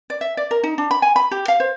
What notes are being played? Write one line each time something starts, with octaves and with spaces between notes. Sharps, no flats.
D5
E5
D5
A#4
D#4
D4
B5
G#5
B5
G4
F5
C5